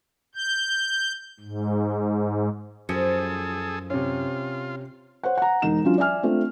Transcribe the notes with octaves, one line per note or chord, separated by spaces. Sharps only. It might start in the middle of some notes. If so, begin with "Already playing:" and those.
G6
G#2
F#2 F3 G#4 A4 C#7
C3 C#4 F4
C5 C#5 F#5
F#5 A#5
E1 D#4 E7
F#3 C#4 D4 F4
D5 E5 G#5 F6
A3 C4 D4 F4